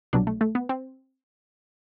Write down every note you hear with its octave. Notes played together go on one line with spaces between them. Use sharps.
C2 B2 F#3 D4
A3
A3
B3
C4